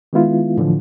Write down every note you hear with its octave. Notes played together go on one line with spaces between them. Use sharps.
D#3 G#3 B3 E4 F4
A2 D3 E3 F3